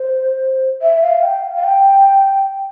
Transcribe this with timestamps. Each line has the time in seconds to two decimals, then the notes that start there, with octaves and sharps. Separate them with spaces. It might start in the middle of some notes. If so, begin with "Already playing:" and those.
Already playing: C5
0.82 E5
1.02 F5
1.22 G5
1.43 F5
1.55 F5
1.63 G5